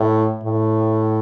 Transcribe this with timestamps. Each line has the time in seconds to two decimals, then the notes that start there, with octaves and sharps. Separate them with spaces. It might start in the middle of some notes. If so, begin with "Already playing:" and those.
Already playing: A2
0.43 A2